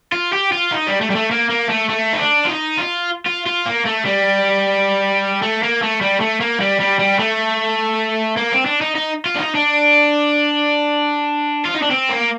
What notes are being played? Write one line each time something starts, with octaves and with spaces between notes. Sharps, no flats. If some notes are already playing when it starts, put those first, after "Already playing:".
F4
G4
F4
D#4
G3
A3
G3
A3
A#3
A#3
A3
A3
D#4
D4
F4
D#4
F4
F4
F4
A#3
A3
G3
A3
A#3
A3
G3
A3
A#3
G3
G3
G3
A3
A#3
C4
D4
D#4
D#4
F4
D4
D#4
D4
F4
D#4
D4
C4
A#3